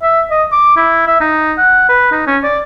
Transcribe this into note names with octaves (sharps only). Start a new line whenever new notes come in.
E5
D#5
D6
E4
E5
D#4
F#5
B4
D#4
C#4
D5